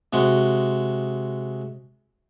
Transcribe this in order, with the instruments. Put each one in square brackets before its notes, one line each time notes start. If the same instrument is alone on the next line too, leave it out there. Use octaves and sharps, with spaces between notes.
[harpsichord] C3 G#3 F#4